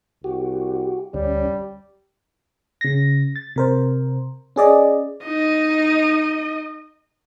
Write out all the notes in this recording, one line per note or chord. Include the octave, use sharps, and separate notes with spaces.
C2 F#4 G4
D2 G3 C#4
C#3 A#6
A6
C3 A#4 C5
C#4 G#4 D5 D#5
D#4 D#5